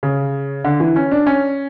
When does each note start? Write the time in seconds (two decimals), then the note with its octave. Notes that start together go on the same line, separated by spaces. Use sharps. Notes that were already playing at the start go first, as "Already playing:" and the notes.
0.03 C#3
0.65 D3
0.80 E3
0.96 C#4
1.11 D4
1.26 C#4